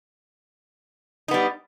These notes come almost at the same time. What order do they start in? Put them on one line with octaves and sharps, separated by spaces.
D#4 B3 G3